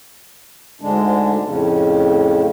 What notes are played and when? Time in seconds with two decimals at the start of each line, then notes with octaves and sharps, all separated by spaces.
0.81 D2 G#2 D3 G#3 D4
1.44 F2 A2 C#3